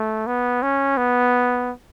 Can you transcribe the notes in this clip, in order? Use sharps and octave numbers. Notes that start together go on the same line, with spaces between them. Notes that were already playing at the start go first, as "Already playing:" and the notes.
Already playing: A3
B3
C#4
B3